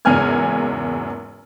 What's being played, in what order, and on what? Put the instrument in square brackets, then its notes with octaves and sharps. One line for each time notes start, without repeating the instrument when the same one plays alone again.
[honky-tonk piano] F#1 E2 G#2 G#5 F6 G#6